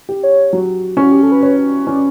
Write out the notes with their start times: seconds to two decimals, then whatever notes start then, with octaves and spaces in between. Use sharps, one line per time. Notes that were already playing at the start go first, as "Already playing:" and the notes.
0.09 G4
0.23 C#5
0.53 F#3
0.97 C#4
1.02 F#4
1.12 G4
1.23 A4
1.32 B4
1.43 B4 C#5
1.86 C#4 D5